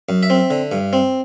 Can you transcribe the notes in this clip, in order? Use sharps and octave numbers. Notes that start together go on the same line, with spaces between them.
F#2
E5
C4
D3
G2
C4